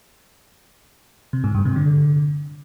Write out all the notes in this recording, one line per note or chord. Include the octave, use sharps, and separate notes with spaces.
C3
G#2
G2
C3
D3